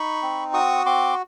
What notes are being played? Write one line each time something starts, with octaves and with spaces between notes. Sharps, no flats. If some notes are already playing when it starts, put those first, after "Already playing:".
Already playing: D#4 B5 C#6
C4
F#4 C#6 D#6
C4 C6 D6